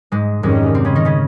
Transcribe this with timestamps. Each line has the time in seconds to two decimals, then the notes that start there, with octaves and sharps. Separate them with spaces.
0.12 G#2 G#3
0.42 F2 G#2 D#3 G3 G#3 C#4
0.75 C3 C4
0.85 C#3 C#4
0.95 D#3 D#4
1.05 C#3 C#4